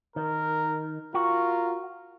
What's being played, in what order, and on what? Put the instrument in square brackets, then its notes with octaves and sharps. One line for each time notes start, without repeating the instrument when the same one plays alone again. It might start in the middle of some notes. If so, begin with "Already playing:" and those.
[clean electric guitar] D#3 [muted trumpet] A#4
[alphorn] F4 [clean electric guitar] F#4 [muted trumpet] A#4